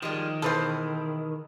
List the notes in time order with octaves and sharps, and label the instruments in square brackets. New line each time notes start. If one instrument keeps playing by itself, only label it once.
[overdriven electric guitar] D#3 [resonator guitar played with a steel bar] F3 G3 G#3
[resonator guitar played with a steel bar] B2 E3 G#4 [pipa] A4 B4 C5